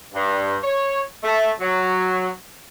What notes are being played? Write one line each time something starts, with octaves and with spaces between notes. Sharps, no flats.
G2
C#5
A3
F#3